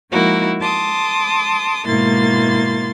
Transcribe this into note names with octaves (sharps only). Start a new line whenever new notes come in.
F3 G#3 A#3 D#4 E4 F#4
A5 C6 D6 D#6
G#2 B2 A#3 E4 C6 A6